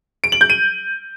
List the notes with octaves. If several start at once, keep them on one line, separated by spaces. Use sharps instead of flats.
D7
F#7
G6
D#7